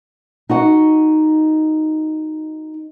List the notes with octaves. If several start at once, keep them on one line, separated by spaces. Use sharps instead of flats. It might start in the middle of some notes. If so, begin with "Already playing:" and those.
D#4 F#4 F#5